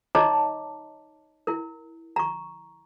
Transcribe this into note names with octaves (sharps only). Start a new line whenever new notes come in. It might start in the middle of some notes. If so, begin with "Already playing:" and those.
D#4 C#5 D#5 A5 A#5 D6
E4 A#4
A#5 C#6